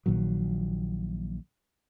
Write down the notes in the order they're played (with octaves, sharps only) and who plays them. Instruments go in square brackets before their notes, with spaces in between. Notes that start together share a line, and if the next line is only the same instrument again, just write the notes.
[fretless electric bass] A#1 A#2 D#3 F#3